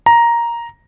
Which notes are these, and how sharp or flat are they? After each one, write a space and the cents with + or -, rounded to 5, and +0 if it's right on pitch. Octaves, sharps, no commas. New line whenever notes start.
A#5 +5